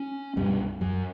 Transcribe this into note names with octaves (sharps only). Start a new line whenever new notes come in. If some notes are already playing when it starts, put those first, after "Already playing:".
Already playing: C#4
C2 G2 B2 G3
F#2 F#3